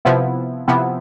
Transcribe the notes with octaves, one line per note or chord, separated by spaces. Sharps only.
C3 F3 B3 E4
C3 F3 B3 E4